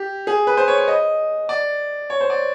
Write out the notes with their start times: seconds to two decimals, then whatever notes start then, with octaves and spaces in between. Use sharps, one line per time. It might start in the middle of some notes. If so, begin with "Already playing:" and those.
Already playing: G4
0.27 G#4
0.47 B4
0.57 C5
0.68 C#5
0.78 C#5
0.88 D#5
1.49 D5
2.10 C#5
2.20 C5
2.30 D5